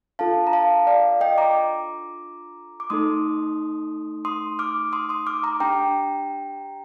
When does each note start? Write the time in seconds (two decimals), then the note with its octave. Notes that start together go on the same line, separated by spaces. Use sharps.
0.19 D4 F4 A4 F5 A5
0.47 A#5
0.53 F5 A5
0.87 D5 F5
1.21 D#5 G5
1.38 A#5 D6
2.80 D6
2.90 A3 D#4 A4 C6 D#6
4.25 C6 D#6
4.59 D6 F6
4.92 C6 D#6
5.09 C6 D#6
5.27 D6 F6
5.43 A#5 D6
5.60 D4 G4 G5 A#5